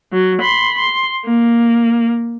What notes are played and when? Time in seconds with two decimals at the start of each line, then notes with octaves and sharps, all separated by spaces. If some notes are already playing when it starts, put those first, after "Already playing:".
0.13 F#3
0.41 B5 C6
0.79 C6
1.25 A#3